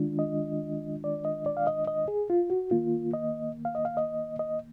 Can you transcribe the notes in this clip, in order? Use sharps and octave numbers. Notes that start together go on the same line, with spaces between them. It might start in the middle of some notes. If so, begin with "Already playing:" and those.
Already playing: D#3 G#3 D4 F4
D#5
D5
D#5
D5
F5
D#5
D#5
G#4
F4
F#4
D#3 A#3 F4
D#5
F5
D#5
F5
D#5
D#5